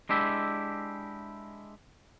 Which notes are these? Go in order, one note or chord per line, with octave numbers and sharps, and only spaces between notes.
G#3 D4 E4 G4 E5